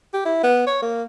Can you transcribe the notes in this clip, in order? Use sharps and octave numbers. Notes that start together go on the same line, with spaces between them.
G4
E4
B3
C#5
A#3